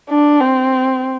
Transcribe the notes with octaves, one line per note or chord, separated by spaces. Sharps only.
D4
C4